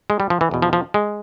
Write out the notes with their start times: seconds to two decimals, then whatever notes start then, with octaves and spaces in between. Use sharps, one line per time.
0.10 G#3
0.20 G3
0.30 F3
0.41 E3
0.51 E2 B2
0.62 F3
0.73 F3
0.94 G#3